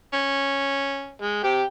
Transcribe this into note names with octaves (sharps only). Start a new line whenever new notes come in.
C#4
G#3
C3 G4 G5